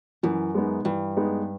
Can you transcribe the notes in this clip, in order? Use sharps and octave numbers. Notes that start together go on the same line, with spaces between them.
F#2 E3
G#3 B3 D#4
G2 E3
G#3 B3 D#4